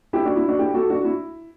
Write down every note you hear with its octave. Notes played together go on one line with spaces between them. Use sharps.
E4 G4
D4 F#4
E4
D4 F#4
E4 G4
F#4 A4
D4 F#4
E4